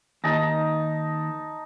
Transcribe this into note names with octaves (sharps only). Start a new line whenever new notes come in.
D#2 D#4 A5 A#5